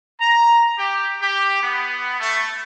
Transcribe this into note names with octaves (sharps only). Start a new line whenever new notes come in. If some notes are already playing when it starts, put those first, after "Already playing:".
A#5
G4
G4
B3
A3